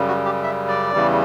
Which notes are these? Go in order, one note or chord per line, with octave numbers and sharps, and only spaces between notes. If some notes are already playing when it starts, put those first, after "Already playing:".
Already playing: F#2 C#3 G3
F#4
G4
E5
D5
E2 C#3 E3 G3